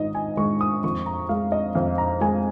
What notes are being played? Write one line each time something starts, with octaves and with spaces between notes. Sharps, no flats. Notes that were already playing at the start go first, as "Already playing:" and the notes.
Already playing: G#1 G#2 D#5
G#5
G#3 C#6
D#6
F2 C#6
A#5
G#3 F5
D#5
F2 F5
A#5
G#3 G#5